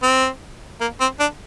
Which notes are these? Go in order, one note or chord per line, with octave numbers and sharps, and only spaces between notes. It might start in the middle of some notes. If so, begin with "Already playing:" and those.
C4
A#3
C4
D4